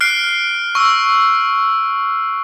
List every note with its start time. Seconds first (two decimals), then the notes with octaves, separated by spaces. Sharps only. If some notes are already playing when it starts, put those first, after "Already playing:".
0.01 F6 F#6 C7 D7
0.75 C#6 E6